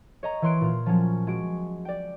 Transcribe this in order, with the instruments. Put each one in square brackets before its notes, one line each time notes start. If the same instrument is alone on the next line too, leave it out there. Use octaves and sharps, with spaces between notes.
[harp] C#5 D#5 A#5
E3 B4 C#5 C6 F#6 D7
A#2 F4
F3 F#3 C#4
G#3 F#4 D7
D5 G5